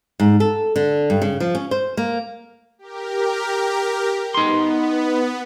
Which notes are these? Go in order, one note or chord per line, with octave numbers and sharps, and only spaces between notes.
G#2
A4
D3
G2
C#3
F3
C#4
C5
A#3
G4 A#4
B3 D#4 C6